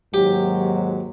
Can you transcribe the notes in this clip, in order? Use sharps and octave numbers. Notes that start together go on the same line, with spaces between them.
D#2 G#2 F#3 G4